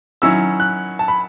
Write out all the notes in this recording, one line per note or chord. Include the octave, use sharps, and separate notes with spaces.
D#3 F#3 C#4 E4 E6
F#6
A5
B5